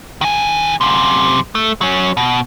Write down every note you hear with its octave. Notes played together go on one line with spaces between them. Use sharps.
D#3 G#5
F#2 C3
A3
F#3 C#4
B2